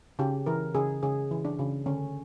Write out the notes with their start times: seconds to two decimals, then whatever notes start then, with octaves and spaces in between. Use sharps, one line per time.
0.19 C#3 G4
0.46 E3 A#4
0.74 C#3 G#4
1.03 C#3 G#4
1.31 E3
1.45 D4
1.59 C#3
1.86 D3 C#4